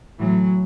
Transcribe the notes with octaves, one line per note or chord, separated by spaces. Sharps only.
A2 E3 F#3